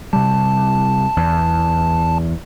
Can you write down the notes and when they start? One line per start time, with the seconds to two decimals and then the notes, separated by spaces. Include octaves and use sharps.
0.13 C3 G3 A5
1.17 E2